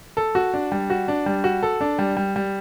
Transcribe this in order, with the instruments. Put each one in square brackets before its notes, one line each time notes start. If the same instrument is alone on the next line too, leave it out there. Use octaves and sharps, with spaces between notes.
[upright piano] A4
F#4
D4
G3
F#4
D4
G3
F#4
A4
D4
G3
G3
G3